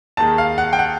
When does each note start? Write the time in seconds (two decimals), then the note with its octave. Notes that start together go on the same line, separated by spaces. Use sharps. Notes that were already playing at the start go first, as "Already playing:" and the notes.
0.17 D#2 D#3 G#3 A5
0.38 F5
0.58 F#5
0.73 G5
0.79 F#5